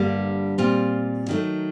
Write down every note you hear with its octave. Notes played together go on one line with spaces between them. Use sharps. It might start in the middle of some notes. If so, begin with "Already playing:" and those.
Already playing: G2 D3 G3 A#3
A#2 G3 C4 F4
D#3 F#3 A3